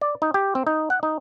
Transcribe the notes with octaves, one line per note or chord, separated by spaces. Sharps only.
D5
D#4
G4
C4
D#4
F#5
D#4